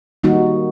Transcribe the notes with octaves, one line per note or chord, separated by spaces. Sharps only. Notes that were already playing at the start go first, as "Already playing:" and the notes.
D#3 G3 A#3 D#4 F#4